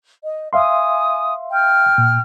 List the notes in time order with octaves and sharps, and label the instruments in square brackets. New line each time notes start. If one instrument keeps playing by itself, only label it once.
[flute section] D#5
[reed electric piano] E5 F5 C6 [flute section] G#5 D#6
[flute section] G5 F6
[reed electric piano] A#2